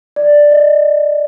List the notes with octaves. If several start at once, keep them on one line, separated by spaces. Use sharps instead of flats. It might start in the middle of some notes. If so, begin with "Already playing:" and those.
D5
D#5